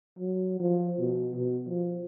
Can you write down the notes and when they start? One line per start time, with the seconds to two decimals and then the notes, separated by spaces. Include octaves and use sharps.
0.19 F#3
0.60 F3
0.99 B2
1.36 B2
1.69 F3